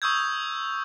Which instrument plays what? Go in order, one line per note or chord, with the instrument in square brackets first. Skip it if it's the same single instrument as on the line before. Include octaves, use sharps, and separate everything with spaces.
[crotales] C#6 D#6 E6 G6 G#6